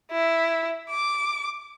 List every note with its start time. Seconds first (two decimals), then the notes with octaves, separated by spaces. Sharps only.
0.11 E4
0.90 D6